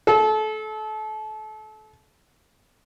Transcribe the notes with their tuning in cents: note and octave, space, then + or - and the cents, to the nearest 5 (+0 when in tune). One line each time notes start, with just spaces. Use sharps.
A4 -30